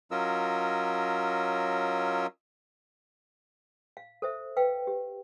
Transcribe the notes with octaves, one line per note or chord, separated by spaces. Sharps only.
F#3 C#4 F4 A#4 D#5 E6
F5
A4 C5 E5
B4 F5 G5
G4